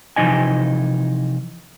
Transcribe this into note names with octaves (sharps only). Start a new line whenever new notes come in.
C3 E3 F3 D#4 D#5 G#5